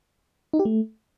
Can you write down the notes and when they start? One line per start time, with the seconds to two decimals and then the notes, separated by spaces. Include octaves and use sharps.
0.53 D#4
0.59 G4
0.65 A3